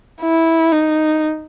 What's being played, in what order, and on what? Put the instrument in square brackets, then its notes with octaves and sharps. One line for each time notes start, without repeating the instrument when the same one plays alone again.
[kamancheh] E4
D#4